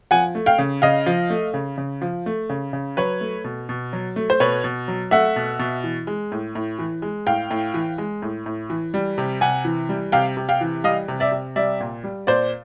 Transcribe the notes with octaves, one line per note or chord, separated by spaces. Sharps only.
F3 F#5 G#5
A3
F5 G5
C#3
C#3 D#5 F5
F3
A3
C#3
C#3
F3
A3
C#3
C#3
F#3 B4 C#5
A3
B2
B2
F#3
A3
C5
B2 B4 C#5
B2
F#3
A3 E5 F#5
B2
B2
E3
G#3
A2
A2
E3
G#3
A2 F5 G5
A2
E3
G#3
A2
A2
E3
G3
C3
C3 F#5 G#5
E3
G3
C3 F5 G5
C3
F5 G5
E3
G3 D#5 F5
C3
D5 E5
C3
G3 D5 E5
A#2
G3
A#2 C5 D5